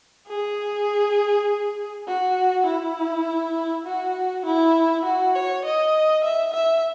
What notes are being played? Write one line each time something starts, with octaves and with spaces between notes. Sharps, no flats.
G#4
F#4
E4
F#4
E4
F#4
C#5
D#5
E5
E5